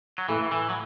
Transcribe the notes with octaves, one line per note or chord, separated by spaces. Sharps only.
F#3
A2 E3
E3
F#3